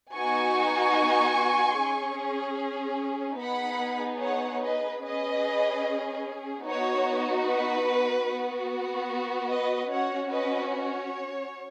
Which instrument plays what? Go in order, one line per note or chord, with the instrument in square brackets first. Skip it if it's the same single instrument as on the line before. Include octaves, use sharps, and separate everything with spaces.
[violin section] B3 D#4 F#4 G#5 C#6
C#4 G#4
B3 D#4 G#4 F#5 B5
C#5 F#5
B4 D#5
C#4 G#4 B4 D#5
B3 D#4 F#4 C#5
B4
B3 F#4
B4 D#5
C#4 F#4 C#5 F#5
B4 D#5
C#5